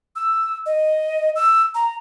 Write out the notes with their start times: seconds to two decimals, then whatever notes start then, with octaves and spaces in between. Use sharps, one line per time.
0.16 E6
0.66 D#5
1.36 E6
1.75 A#5